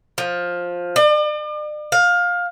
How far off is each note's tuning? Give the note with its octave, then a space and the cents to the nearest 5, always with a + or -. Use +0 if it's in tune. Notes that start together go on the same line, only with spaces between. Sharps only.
F3 +10
D5 +40
F5 +20